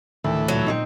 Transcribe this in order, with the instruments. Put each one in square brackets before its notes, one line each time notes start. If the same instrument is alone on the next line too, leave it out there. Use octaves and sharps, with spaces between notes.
[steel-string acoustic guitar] D2 [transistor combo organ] A2 E3 [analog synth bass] D#3
[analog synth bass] A#2 [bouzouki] F#3
[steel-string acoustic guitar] C4 C#4 D#4